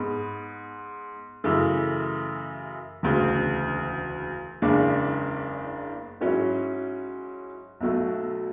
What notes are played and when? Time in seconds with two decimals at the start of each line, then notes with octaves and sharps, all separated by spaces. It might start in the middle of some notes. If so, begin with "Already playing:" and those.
Already playing: G#2 G#3 B3
1.44 F#2 C#3 E3 A3
3.03 E1 D2 C#3
4.62 F#1 E2 C#3 G#3 D4
6.21 G#2 F#3 C#4 E4
7.81 B1 B2 F#3 A3